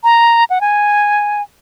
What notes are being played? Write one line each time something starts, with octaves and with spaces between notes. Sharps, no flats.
A#5
F#5
G#5